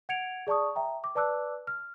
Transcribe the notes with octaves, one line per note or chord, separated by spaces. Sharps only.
F#5 G#6 C#7 D7 F7
G#4 D5 A5 C#6 D#6
E5 G5 A#5
D6
B4 D5 A5 D6 E6 F#6
F6